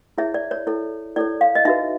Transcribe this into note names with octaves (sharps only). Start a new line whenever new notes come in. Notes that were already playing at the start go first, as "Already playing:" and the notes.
E4 G#4 C#5 E5
D5
C#5
E4 A4 C#5
E4 A4 C#5 D5
F5
D#5
D#4 F#4 B4 E5